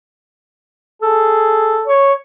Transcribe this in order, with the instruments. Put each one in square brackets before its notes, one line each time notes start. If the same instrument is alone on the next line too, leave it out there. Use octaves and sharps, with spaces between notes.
[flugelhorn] G#4 [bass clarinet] A4
[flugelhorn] C#5